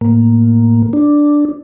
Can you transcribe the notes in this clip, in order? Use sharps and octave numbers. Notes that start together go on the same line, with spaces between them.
A2 A#3
D4